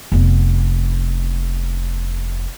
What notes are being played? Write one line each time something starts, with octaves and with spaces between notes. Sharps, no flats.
F1 B3